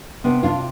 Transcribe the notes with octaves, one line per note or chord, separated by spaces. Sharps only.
C3 B3 D4
D4 F4